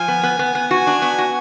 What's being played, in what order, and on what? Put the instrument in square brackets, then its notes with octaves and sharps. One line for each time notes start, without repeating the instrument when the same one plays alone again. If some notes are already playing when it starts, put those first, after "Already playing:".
Already playing: [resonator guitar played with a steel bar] F3 [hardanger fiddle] G#5
[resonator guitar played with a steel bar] B3
B3
B3
B3
[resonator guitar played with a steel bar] F#4 [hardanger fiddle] G#5
[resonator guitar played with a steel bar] D4
B3
F#4